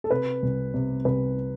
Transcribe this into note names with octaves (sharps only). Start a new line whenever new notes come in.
A4
C3 B4
C2
C3
C2 B4